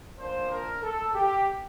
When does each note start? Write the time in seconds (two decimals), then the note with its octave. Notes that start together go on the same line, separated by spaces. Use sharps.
0.18 A#2 F3 A#3 D4 C5
0.50 A#4
0.83 A4
1.15 G4